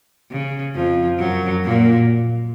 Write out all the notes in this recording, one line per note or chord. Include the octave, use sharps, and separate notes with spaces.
C#3
F2 F3
F#2 F#3
A#2 A#3